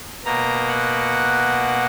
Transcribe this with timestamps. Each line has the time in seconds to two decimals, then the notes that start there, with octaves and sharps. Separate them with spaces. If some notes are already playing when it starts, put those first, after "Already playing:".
0.25 B2 A#3 A#5
0.68 F#5